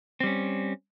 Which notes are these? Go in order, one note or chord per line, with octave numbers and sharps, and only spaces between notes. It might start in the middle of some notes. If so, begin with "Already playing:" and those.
G3 C4 C#4